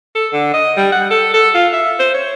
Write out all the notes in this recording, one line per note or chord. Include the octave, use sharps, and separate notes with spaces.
A4
D3
D#5
G3
F#5
A4
A4
F4
E5
C5
C#5